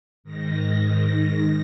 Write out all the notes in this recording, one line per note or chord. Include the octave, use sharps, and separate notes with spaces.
G#2 D#3 A#6